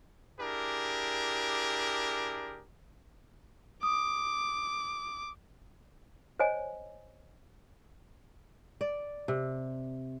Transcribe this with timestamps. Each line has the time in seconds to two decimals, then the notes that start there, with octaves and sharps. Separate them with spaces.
0.39 D4 E4 G4 G#4 A#4
3.83 D6 D#6
6.40 C5 C#5 D#5 G#5
8.81 D5
9.28 C3